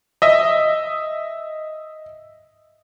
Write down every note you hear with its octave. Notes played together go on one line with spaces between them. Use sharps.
D#5 E5 D#6